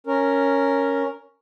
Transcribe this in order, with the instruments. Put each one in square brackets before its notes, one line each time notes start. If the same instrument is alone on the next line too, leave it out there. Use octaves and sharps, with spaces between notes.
[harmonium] C#4 A#4